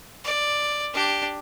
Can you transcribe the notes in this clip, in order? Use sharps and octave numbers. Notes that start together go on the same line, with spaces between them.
D5
D4 G4